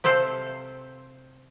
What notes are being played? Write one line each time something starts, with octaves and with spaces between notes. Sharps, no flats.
C3 C4 A4 C5 F5